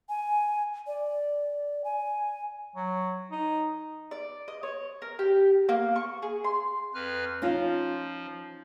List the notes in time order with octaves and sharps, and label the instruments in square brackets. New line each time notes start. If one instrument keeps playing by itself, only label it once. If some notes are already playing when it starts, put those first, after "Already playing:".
[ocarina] G#5
D5
G#5
[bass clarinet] F#3
D#4
[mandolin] D5
D#5
C#5
A#4
G4
A#3
C#6
G#4
C6
[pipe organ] F2 B4 F6
[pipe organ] F3 [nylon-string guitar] C#4 D#4 F4